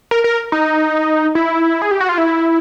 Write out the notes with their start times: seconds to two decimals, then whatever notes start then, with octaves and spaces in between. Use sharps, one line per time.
0.11 A#4
0.24 A#4
0.52 D#4
1.35 E4
1.82 G#4
1.91 G4
2.00 F#4
2.09 F4
2.18 E4